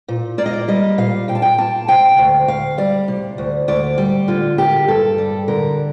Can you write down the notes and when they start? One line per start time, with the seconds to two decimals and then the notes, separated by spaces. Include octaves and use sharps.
0.08 A#2
0.38 A#3 D5
0.46 D#5
0.53 D5
0.68 G3 D#5
0.98 A#2 F5
1.28 A#2 G5
1.35 A5
1.42 G5
1.58 A#3 A5
1.88 C3 G5
2.18 D2
2.48 D2 F5
2.78 G3 D5
3.08 C3
3.38 D2
3.68 D2 D5
3.98 G3
4.28 D3 F4
4.58 A#3 G4
4.88 G2 A4
5.18 G3
5.48 D3 A#4